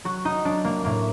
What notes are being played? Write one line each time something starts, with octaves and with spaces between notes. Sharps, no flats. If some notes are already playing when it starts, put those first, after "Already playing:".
F#3 F#4
D#4
F#3 D4
A#3
A2 A#3